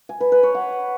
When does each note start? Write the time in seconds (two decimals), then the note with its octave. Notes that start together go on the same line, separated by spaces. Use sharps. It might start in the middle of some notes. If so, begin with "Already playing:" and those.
0.09 G#5
0.21 B4
0.32 B4
0.43 C#5
0.55 F#5